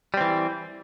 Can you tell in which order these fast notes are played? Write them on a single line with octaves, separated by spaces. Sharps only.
G3 C4 E3